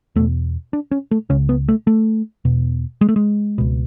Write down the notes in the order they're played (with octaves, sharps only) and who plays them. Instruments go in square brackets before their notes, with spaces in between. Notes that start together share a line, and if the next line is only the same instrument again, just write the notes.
[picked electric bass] E2 B2 A3
D4
C#4
A3
C#2 C#3 C#4
B3
A3
A3
E2 B2
G#3
A3
G#3
C#2 B2